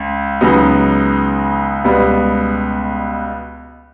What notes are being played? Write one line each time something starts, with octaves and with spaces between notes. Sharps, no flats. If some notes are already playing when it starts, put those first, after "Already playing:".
Already playing: C#2
C#2 C#3 F#3 B3 D#4
C#2 B2 G3 B3